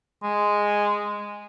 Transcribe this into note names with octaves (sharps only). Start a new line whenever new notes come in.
G#3